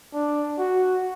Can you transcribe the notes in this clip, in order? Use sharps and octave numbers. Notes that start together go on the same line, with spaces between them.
D4
F#4